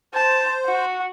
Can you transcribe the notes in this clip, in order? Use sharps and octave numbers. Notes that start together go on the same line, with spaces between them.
C5 A5
F#4 F#5